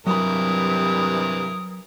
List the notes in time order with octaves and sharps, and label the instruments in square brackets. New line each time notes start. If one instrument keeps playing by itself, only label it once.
[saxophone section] G2 C3 [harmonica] E3 A#4 [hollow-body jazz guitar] F#3 B5 [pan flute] D#6